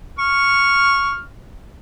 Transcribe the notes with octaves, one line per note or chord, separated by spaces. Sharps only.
C#6 F6